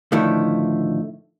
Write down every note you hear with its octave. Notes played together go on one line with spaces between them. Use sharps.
A2 D3 D#3 F3 A3 E4